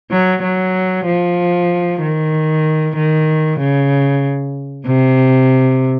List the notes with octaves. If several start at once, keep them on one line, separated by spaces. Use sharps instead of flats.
F#3
F#3
F3
D#3
D#3
C#3
C3